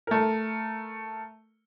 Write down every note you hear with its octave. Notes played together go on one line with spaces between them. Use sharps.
A3 A#4